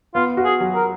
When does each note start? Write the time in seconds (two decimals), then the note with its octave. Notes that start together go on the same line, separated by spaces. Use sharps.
0.14 B3 F4
0.37 F#4
0.45 G#4
0.60 F#3
0.75 A#4